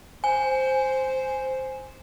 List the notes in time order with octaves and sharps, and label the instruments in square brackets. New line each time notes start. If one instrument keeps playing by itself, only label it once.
[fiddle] C5 [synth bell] G#5